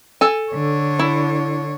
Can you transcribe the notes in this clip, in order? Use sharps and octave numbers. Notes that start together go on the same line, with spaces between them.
A4 G#5
D3 C#5
E4